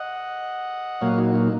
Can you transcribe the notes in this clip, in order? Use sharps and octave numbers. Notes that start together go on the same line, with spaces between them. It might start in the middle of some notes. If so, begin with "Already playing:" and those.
Already playing: D#5 F#5
A#2 F#3 A#3 C#5 F5
D#4 F#4
D#4